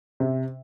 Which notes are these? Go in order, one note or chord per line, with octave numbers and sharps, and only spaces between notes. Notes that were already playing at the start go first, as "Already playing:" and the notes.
C3